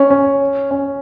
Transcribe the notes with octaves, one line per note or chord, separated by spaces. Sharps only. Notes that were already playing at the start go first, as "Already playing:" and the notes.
Already playing: C#4
C#4
C#4